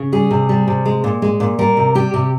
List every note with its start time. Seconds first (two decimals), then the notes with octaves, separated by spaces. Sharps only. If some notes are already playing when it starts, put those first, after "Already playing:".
Already playing: C#3
0.12 G3 G#4
0.31 C3
0.49 G3
0.68 C3
0.85 G#3
1.04 A#2
1.22 G#3
1.40 A#2
1.59 G3 A#4
1.77 C3
1.95 G3 G4
2.14 C3 G4